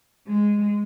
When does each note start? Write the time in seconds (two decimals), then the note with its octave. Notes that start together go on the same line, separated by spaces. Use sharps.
0.28 G#3